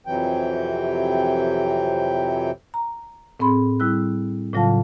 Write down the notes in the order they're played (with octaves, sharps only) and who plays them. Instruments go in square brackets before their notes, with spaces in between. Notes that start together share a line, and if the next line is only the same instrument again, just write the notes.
[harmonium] F2 C3 E3 F#3 G5
[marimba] A#5
A2 C4 G#4 B5 C6
G3 E4 E6 F#6
A2 C#3 F#3 F4 F5 A5